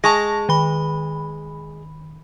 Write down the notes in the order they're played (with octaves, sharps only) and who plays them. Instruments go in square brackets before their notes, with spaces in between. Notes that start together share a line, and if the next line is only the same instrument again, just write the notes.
[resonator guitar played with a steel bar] G#3 [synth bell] A5 C#6 A#6
[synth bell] D#3 B5